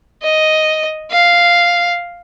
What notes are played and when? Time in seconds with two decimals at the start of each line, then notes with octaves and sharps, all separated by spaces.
0.23 D#5
1.11 F5